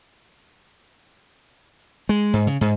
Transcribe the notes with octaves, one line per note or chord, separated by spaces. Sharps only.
G#3
G#2
C#3
G#2